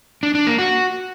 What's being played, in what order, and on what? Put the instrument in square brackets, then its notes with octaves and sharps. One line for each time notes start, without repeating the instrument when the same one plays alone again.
[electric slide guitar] D4
D4
A#3
F#4